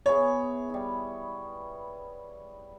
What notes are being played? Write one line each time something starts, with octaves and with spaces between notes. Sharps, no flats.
B3 E4 G#4 C#5
G3 E4